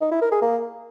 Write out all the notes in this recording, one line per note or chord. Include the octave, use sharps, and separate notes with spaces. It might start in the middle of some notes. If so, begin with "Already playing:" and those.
D#4
E4
A#4
G#4
A#3